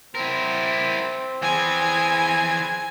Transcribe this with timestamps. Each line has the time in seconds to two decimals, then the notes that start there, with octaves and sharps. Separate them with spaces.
0.15 C4 E4 A#4
1.42 E3 G#4 G#5